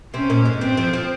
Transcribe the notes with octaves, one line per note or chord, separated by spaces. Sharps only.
C3 C4 C#4
A#2 A#3
G#2 G#3
G2 G3 C4
F2 F3
F3